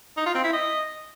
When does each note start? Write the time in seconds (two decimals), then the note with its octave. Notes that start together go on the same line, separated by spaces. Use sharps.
0.17 D#4
0.26 F4
0.35 C4
0.44 E4
0.53 D#5